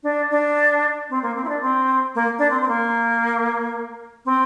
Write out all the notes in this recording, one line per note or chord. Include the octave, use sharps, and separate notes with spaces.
D4
D4
C4
A#3
C4
E4
D4
C4
A#3
D4
C4
C4
A#3
C4